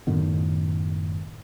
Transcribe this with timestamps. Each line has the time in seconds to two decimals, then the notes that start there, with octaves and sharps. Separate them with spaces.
0.07 F#2 A2 D#3 B3